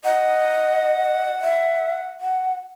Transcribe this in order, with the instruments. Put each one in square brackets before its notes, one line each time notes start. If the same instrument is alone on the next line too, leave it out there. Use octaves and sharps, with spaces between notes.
[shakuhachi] D#5 [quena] F#5
[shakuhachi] E5
F#5